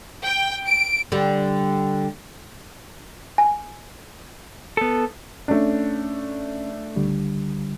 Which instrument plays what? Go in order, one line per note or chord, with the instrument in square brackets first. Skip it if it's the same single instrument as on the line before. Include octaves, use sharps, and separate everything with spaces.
[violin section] G5
D7
[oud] D3 G3
[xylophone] G#5
[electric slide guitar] B3 A4
[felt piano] A3 D4 [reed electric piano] C#4
[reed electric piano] C#2 D3 G3